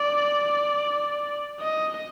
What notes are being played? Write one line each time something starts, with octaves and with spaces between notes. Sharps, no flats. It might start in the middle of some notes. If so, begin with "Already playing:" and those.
Already playing: D5
D#5